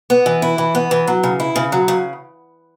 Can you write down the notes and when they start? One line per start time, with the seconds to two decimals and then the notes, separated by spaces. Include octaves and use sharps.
0.10 B3
0.26 E3
0.42 E4
0.58 E3
0.75 B3
0.91 E3
1.07 F#3
1.23 C#3
1.40 E4
1.56 C#3
1.72 F#3
1.88 C#3